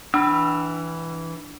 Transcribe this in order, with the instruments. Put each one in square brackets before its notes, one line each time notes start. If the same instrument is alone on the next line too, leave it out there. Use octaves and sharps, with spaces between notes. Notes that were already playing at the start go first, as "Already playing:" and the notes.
[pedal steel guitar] E3 B5 E6 [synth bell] D4